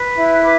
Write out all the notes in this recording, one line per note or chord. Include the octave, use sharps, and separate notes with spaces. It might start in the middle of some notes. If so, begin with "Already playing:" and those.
Already playing: B4
E4
B4 D6